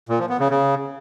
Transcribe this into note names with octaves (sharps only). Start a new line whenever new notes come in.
A#2
F3
B3
C#3
C#3